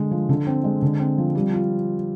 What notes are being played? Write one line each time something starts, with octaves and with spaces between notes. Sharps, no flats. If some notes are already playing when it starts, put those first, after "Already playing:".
Already playing: D3 G#3
F3
D3
C4
G#3
D3
C4
F3
G3
F4